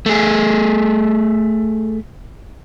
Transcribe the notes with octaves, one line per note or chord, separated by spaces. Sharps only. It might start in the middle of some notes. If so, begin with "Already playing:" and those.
A3 G#4